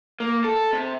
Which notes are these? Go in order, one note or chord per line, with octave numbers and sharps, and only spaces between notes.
A#3
A4
C3